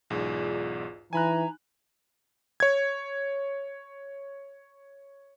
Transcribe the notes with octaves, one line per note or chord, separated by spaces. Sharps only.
B1 E2 G#2 F4 G#4 D5
E3 D#4 G#5 A#5 B5 F#6
C#5 G#6